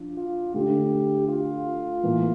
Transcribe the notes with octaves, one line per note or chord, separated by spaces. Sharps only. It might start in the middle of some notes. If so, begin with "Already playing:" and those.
Already playing: F3 D4
F4
D3 A3 D4 G4
F4
A2 E3 A#3